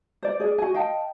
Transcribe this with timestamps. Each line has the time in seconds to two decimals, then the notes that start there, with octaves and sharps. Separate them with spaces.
0.23 C5 D5
0.40 G#4 D5
0.58 F#4 G#4 G#5
0.74 D#5 F5 G5 A5